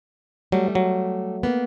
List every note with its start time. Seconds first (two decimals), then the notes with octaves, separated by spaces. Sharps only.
0.52 F#3 G3 A3
0.75 F#3
1.43 A#3 B3